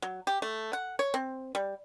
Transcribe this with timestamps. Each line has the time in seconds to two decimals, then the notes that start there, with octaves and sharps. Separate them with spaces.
0.02 F#3
0.27 G4
0.42 A3
0.73 F#5
0.99 C#5
1.14 C4
1.55 G3